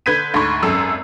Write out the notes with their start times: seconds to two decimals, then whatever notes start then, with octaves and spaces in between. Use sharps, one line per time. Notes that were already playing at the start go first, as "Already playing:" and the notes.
0.06 D3 B4 G6 G#6 B6 D#7
0.34 D2 G#2 D3 B5 C#6
0.63 G#1 F#2 A4 E6